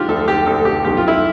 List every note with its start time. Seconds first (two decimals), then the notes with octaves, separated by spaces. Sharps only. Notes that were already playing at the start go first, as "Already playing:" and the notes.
Already playing: D3 D4 F4 G4
0.08 D2 A4
0.28 G4
0.46 D2 A4
0.65 G4
0.85 B1 G4
0.97 F4
1.08 E4